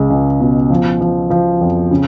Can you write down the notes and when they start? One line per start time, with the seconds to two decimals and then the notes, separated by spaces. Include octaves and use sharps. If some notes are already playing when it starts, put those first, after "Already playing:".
Already playing: C#2 G#3
0.10 C#2
0.40 B2
0.70 F3
1.01 F3
1.30 F3
1.61 F2
1.91 C#3